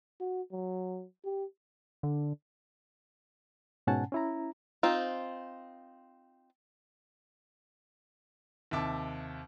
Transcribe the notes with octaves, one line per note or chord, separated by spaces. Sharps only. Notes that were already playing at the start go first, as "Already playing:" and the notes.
F#4
F#3
G4
D3
G#2 B2 C#4 F#5 G#5 A5
C#4 E4 A#5
C4 D#4 F4
D#2 C3 E5 A5 D6